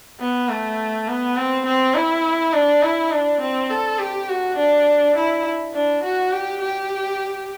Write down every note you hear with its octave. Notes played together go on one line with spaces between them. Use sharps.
B3
A3
B3
C4
C4
E4
D4
E4
D4
C4
A4
G4
F#4
D4
E4
D4
F#4
G4
G4